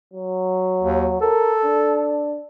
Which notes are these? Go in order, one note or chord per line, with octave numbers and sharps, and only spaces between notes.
F#3
D#2
A4 A#4
D4